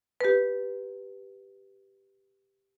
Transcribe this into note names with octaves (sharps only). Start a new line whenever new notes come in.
G4 B4